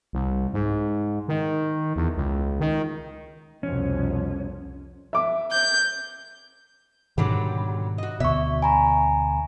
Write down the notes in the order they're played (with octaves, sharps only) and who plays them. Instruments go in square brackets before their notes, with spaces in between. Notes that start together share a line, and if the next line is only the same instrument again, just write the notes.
[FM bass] C2
G#2
D#3
E2
C#2
D#3
[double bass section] C2 F2 B2 [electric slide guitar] C#4
[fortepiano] E5 D6
[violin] G6
[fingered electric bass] G#2 B2 D#3 [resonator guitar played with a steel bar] D3 F#3 G3
[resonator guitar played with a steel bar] F#4 D#5
[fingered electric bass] D2 B2 [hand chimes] D5 C#6 [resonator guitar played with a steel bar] E5
[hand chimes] G#5 A#5 B5